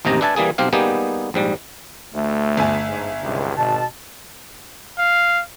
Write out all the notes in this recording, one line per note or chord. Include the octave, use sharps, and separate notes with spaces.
A1 D#2 C3 D#4 A#5
D4 B4 E5 G#5 A5
E3 G3 A#3 G#4
B1 C4 G4 F5
G3 A#3 B3 D#4 G4 G#4
A#1 G#2 G3
D2 A3
G1 E5 G#5
G#2
G#1 C#2 G2 C3
G#1 B2 A5
F5